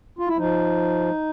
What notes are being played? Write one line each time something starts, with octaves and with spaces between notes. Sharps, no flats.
F4
E4
F3 D#4